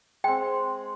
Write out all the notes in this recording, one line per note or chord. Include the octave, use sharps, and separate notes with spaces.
G#3 C4 G5